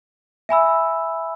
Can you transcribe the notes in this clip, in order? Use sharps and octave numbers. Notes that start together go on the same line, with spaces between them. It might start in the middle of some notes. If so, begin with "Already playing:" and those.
E5 G#5 B5 E6